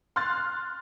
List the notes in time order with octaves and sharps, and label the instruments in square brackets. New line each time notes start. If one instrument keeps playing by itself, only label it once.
[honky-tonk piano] C6 F6 F#6 A6